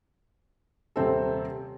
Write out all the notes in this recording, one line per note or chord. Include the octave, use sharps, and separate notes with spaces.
D#1 C3 C4 A4